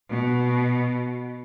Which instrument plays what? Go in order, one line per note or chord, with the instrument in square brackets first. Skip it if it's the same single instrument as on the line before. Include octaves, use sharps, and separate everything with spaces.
[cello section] B2